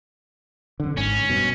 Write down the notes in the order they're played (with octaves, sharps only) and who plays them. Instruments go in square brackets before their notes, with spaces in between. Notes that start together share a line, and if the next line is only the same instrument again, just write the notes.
[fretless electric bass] F#2 D3
[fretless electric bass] G#1 G#2 [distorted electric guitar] C#4
[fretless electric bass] G2 B2